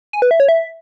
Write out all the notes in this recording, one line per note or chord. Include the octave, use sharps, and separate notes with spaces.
G#5
B4
E5
C#5
E5